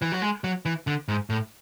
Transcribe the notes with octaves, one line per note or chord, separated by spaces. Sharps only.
E3
F#3
G#3
F#3
E3
D3
G#2
A2